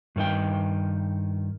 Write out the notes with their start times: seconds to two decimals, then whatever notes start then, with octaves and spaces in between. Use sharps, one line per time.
0.16 G2 D#3 C#4 D#5 G5